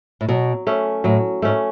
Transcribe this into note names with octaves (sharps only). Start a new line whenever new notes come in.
A2
B2 F#3
A3 C#4
A2 F#3
G#2 A3 C#4